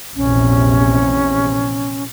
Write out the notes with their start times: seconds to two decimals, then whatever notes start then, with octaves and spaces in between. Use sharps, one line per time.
0.16 A#1 E2 C3 C#4